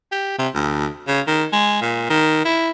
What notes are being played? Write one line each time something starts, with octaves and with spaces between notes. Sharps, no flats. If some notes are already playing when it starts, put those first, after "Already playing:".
G4
C3
D2
C#3
D#3
G#3
A#2
D#3
E4